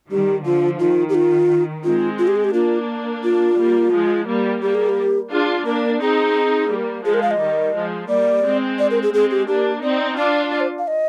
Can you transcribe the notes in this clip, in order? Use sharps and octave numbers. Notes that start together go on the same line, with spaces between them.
D#3 G3 G4
D3 F3 F4
D#3 F4
G4
F4
G#3 C4 F4
F4
G4
G#4
G4
A#3 D4 F4
F4
G3 A#3
F3 G#3
G3 A#3
G3 A#3 G4
G#4
G4
D4 F4 G#4
A#3 D4 A#4
C4 D#4 G#4
G3 A#3
F3 G#3 G#4
A#4
F5
D#5
D#3 G3
F3 G#3
G3 A#3 D5
G#3 C4
D5
A#4
G#4
G#3 C4 G#4
G4
A#3 D4 G4
C4 D#4 D5
D4 F4 D5
D5
C5
F5
D#5